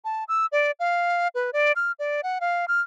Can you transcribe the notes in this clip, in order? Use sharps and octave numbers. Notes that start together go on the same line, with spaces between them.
A5
E6
D5
F5
B4
D5
F6
D5
F#5
F5
F6